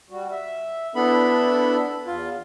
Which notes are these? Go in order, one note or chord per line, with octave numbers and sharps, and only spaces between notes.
G3 F#4
E5
B3 D4 E4 A4 B5
E2 F4